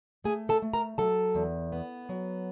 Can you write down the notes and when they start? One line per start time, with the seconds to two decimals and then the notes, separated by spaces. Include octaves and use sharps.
0.24 A3 G#4 G#5
0.49 A4 A5
0.62 A3
0.73 A#4 A#5
0.98 F#3 A4 A5
1.35 E2
1.72 B3
2.09 F#3